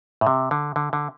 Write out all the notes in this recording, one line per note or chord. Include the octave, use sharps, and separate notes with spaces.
A2
C3
D3
D3
D3